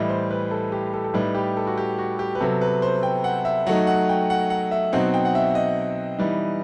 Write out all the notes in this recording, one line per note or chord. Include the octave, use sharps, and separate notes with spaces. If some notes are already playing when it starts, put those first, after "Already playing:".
Already playing: A2 E3 G3 D#5
C5
B4
A4
G4
A4
A4
A2 G3 D#4 B4
G4
A4
F#4
G4
F#4
G4
B4
C3 F#3 B3 A4
B4
C5
G5
F#5
E5
F#3 A3 D#4 F#5
F#5
G5
F#5
F#5
E5
B2 F#3 C4 D#4 F#5
G5
F#5
E5
D#5
E3 G3 B3 D#4